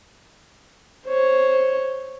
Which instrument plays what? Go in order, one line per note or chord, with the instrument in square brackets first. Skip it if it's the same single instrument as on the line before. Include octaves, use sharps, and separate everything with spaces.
[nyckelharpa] C5 C#5